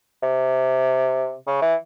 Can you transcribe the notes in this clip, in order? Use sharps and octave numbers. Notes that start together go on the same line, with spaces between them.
C3
C#3
E3